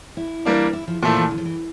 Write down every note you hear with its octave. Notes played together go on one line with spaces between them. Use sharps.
E4
E3 G3 A#3 D4
E4
F3
A#2 E3 F3 A3 E4
E3
D3
F3
E3